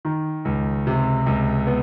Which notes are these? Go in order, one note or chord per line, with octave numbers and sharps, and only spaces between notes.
D#3
C#2
C3
C#2
B3